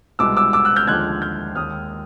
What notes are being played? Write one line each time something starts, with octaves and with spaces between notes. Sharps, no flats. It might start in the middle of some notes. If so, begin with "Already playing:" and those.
C2 B2 G#3 B3 D6 E6
D6 E6
D6 E6
E6 F#6
F6 G6
D#2 D3 F3 G#3 F#6 G#6
F6 G6
D#2 D#3 G#3 D#6 F6